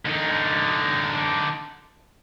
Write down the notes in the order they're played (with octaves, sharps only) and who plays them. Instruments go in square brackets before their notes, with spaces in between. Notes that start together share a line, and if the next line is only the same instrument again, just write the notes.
[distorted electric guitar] D3 D#4